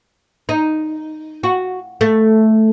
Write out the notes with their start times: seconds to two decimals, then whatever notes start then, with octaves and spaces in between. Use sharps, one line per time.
0.49 D#4
1.43 F#4
2.01 A3